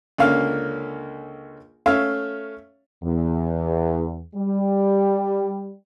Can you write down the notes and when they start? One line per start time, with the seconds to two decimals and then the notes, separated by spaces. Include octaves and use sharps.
0.18 C#2 D3 A#3 C#4 F5
1.86 A3 C#4 C#5 E5 F5
3.04 E2
4.35 G3